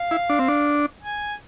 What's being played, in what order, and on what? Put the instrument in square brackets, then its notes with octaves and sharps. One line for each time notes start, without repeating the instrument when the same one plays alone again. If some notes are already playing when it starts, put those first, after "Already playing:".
Already playing: [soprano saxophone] F5
[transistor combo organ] E4
D4
C4
D4
[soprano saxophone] G#5